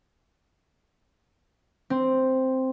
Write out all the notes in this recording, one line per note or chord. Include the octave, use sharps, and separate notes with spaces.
C4